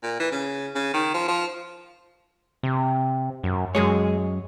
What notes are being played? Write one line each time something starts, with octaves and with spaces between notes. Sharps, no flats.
A#2
E3
C#3
C#3
D#3
F3
F3
C3
F#2
F#2 G#3 G#4 C#5